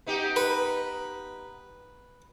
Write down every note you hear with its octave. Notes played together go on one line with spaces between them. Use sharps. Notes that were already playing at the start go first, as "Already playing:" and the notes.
B3 D#4 G4
B4